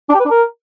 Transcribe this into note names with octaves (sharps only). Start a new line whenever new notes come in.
D4
G4
B4
D4
A#4